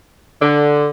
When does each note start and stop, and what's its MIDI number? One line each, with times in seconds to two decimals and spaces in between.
0.40 0.88 50